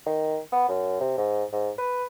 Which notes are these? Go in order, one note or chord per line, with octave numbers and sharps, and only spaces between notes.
D#3
B3
F#2
C3
G#2
G#2
B4